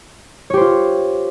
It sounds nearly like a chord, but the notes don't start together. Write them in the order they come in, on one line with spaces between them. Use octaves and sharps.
C#5 G4 C5 F4